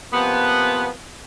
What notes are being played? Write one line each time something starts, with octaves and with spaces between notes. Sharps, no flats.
C3 F3 A#3 B3